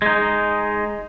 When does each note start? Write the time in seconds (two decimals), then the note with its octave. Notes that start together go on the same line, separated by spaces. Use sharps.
0.02 G#3 D#4